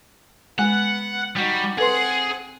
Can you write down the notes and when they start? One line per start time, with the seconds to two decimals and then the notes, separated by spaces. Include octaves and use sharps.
0.59 G#3 B3 F#5 G#5
1.36 G3 D#4 F#4
1.78 C4 G#4 A4 B4 F#5 C6